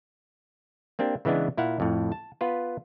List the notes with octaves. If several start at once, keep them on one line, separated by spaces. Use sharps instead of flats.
A#3 C4 D4 G4
C#3 E3 G#3 B3 D4
A#2 E4 F5 F#5
F2 A2
A5
B3 F4 B4